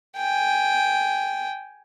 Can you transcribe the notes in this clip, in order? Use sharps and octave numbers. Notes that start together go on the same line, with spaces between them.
G5 G#5